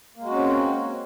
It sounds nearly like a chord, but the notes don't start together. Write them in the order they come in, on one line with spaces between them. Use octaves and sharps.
A#3 G#3 F#4 C#4 C4